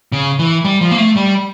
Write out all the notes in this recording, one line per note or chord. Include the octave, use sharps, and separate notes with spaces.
C#3
E3
G3
F3
A#3
A3
G3